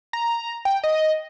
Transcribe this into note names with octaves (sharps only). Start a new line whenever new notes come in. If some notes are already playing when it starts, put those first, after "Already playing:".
A#5
G5
D#5